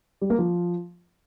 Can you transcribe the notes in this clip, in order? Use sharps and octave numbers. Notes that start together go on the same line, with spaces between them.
G3
A#3
F3